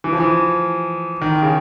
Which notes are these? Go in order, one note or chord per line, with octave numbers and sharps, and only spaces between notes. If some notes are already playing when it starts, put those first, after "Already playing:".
E3
F3
E3
D#3
C#3